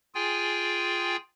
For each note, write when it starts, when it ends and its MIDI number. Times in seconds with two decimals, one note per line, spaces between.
0.15 1.16 65
0.15 1.16 68
0.15 1.16 79
0.15 1.16 80